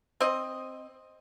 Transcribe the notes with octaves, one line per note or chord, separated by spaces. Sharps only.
C4 D#5